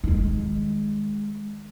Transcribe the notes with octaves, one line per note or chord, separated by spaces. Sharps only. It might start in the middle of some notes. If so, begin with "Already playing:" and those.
D#3 G#3